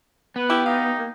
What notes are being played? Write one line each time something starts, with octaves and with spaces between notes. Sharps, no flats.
B3 B4
E4 G4
D#4 F5
A#3